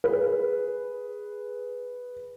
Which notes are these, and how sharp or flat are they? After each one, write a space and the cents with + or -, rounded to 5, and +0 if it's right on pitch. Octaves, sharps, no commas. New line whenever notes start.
G#4 +0 B4 +0